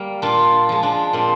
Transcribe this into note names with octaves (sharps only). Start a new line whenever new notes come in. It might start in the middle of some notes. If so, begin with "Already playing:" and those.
Already playing: G3 A#3
A#2 D4 F4
F3 G#3
D4
A#2 C4